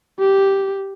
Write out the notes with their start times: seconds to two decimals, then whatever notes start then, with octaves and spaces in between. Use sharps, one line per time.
0.20 G4